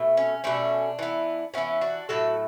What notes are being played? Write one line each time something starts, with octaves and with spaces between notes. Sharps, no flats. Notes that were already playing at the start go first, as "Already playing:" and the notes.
Already playing: B2 A3
C#4
B2 A3 C#4 D4
E3 B3
E3 B3 C#4 E4
D4 F#4
A2 F#3 A3 F#4 A4